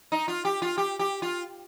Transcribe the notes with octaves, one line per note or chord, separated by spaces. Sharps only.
D#4
F4
G4
F4
G4
G4
F4